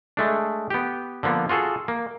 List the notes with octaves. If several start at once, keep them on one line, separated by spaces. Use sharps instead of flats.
G#3 A3 D4
B3 G4
D3 F3 A#3 B3
F4 F#4 G#4 A4
A#3